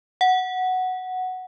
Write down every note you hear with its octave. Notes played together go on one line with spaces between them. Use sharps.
F#5